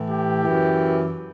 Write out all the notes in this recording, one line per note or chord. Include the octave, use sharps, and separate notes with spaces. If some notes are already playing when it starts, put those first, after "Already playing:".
Already playing: A2 E3
G4
F#2 E3